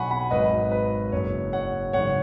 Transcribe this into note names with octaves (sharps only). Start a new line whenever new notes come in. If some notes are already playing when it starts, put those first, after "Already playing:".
Already playing: B1 B2 F#3 F#5 G#5 B5 C#6
F#5 B5
G#1 G#2 F#3 B4 D#5
B4
F#1 F#2 F#3 C#5
C#5 F#5
G#1 F#2 C#3 C#5 F#5